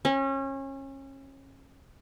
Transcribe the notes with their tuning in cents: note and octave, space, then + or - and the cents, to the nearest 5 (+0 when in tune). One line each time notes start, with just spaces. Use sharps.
C#4 -30